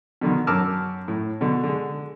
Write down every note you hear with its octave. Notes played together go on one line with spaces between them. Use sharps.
B2 D3 D#3
F#2 A#4 A5 D6 E6 F6
A2
B2 D3
D3 G#3